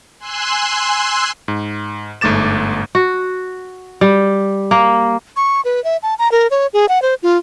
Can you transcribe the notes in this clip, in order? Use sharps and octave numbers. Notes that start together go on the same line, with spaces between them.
G#5 C6 E6 F#6
G#2
G1 G#2 A3 D6 A6 E7
F#4
G3
A#3
C#6
B4
E5
A5
A#5
A#4
C#5
G#4
F#5
C5
F4